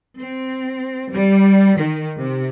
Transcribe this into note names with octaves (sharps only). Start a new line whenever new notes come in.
C4
G3
D#3
C3